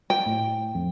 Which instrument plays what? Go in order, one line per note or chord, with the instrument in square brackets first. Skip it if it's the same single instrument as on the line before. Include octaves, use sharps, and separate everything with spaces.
[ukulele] G5
[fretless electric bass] A2
F2